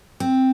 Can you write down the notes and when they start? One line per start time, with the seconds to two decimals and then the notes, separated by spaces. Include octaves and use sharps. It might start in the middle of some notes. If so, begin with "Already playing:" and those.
0.20 C4